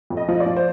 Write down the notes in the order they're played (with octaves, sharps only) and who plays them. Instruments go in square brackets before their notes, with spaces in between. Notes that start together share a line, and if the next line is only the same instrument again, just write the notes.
[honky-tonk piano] F2
D#5
F3
D5
F3
C5